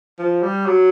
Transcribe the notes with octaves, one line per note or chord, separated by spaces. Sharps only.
F3
G3
F#3